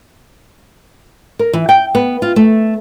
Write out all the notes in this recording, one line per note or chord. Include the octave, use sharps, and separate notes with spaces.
A#4
E3
G5
B3
F4
A3